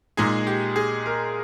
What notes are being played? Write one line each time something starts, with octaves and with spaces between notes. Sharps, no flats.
A#2 G#3 D#4 G#4
G4
G#4
A#4